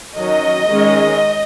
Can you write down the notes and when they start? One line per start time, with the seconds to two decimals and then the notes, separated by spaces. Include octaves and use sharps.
0.16 D#3 F#3 C#4 D#5
0.68 D#3 G#3 C#4